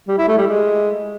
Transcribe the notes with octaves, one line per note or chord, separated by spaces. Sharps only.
G3
E4
A3
G3
G#3